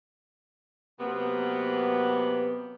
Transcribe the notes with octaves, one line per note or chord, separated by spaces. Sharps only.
C3 F#3 A#3 B3